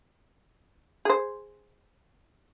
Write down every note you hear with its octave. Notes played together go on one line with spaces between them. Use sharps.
G#4 C5